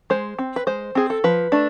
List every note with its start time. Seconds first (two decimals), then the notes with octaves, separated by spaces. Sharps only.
0.10 G#3 C5
0.39 C4
0.56 B4
0.67 G#3 C5
0.95 C4 G#4
1.10 A4
1.24 F3 B4
1.52 A3 D4